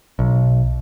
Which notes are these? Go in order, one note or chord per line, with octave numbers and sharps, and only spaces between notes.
B1